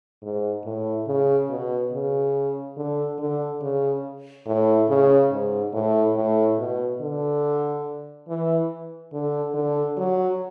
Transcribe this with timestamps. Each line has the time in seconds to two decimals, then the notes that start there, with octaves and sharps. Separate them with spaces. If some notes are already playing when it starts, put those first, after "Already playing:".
0.22 G#2
0.65 A2
1.07 C#3
1.50 B2
1.92 C#3
2.77 D3
3.19 D3
3.61 C#3
4.46 A2
4.89 C#3
5.31 G#2
5.73 A2
6.16 A2
6.58 B2
7.00 D3
8.28 E3
9.13 D3
9.54 D3
9.97 F#3